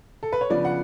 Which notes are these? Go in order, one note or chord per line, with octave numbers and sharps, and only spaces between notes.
A4
B4
C#5
C#3 F3 B3 D4 D5
F#5